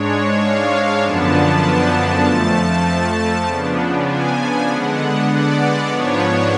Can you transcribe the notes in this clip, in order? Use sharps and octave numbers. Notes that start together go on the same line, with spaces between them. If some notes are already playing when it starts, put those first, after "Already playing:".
Already playing: G#2 G#3 D4 C#5
F5
F#2 D3 F3 B3 D4 A5
F2 F3 A3 A5
C#3 F3 B3 D4
G#5
D3 G#3 B3 D4 F#5
D5
G#2 F3 B3 D4 C#5